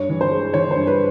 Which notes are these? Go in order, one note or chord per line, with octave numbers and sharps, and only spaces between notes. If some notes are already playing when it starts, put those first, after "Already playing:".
Already playing: G2 C#5
E3
C5
G#3
E3 C#5
C5
G2
B4